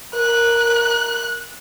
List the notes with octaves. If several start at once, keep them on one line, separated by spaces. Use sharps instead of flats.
A#4 F#6